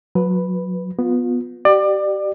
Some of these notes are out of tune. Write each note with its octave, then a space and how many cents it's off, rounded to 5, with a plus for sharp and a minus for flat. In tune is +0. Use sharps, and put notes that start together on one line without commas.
F#3 -25 B4 +0
B3 +0 F4 +25
G4 -30 D5 +25